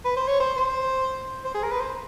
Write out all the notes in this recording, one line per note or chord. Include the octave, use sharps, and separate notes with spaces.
B4
C5
C#5
C5
C5
C5
G#4
A#4
B4
C5